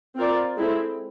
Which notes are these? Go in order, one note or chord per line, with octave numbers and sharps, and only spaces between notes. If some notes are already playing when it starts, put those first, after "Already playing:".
C4 F4 A#4 D5
G#3 C4 E4 A4